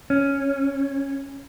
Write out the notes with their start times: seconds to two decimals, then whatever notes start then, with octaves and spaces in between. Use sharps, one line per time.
0.10 C#4